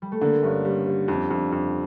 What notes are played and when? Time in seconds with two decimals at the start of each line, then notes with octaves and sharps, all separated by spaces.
0.02 G3
0.12 A3
0.21 D3 A#3
0.43 G2 C#4
0.65 G3
0.87 G3
1.08 F2 D4
1.31 F2
1.52 F2